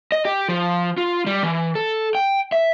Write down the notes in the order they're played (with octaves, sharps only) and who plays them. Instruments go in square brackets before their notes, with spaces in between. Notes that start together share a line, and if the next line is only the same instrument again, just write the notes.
[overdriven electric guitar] D#5
G4
F3
F4
G3
E3
A4
G5
E5